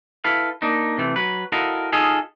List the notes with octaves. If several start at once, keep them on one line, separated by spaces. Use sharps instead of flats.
E4 A4 B4 F5
A#3 D4 D#4
C3 E3 A3
F#3 B4
E4 F#4 A4 A#4 D#5 F5
D#4 F4 G#4 A4 D#5 F5